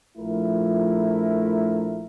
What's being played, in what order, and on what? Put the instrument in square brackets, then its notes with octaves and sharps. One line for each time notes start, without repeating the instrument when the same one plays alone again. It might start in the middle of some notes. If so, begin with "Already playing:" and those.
[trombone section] A#1 F3 A3 E4 F4 A#4